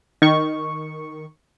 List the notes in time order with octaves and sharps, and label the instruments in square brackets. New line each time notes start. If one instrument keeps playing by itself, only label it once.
[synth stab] D#3 C#6